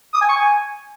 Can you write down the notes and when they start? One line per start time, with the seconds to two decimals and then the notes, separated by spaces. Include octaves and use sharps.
0.14 D#6
0.21 G#5
0.28 C#6
0.36 G#5